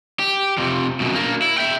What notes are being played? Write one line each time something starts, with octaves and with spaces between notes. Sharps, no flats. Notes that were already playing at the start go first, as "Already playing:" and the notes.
G4
F2 C3
F#2 B2
A#3 D4
E4
E5 G5